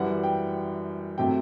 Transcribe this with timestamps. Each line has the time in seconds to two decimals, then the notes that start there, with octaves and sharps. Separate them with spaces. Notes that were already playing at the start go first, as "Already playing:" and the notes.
Already playing: F#2 E3 G3 F#5
0.23 G5
1.18 C3 F#3 A3 G5